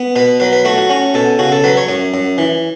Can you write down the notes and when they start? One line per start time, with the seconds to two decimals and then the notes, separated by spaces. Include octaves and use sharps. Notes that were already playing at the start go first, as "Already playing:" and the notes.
Already playing: B3
0.16 B2 B4
0.40 F#3 B4
0.53 B4
0.65 A3 F#4
0.78 F#4
0.90 C#4 F#4
1.14 B2 A4
1.39 C#3 F#4
1.52 A4
1.64 F#3 B4
1.77 C#5
1.89 F#2
2.14 F#2
2.38 E3